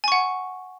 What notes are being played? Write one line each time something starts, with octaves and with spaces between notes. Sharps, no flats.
F#5 G#5 C#6